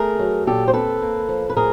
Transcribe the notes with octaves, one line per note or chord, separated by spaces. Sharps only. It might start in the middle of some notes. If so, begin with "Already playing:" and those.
Already playing: A3 G#4 A#4
F#3
A#2 G4 A4
C5
C4 A4 B4
A#3
F3
B4
A2 G#4 A#4